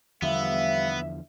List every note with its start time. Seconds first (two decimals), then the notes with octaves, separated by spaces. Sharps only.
0.22 E2 D3 F3 G3 A3 B3 E5 F5